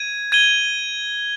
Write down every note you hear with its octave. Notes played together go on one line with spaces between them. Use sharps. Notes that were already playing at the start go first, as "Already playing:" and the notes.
Already playing: G#6 D#7
G#6 D#7 G7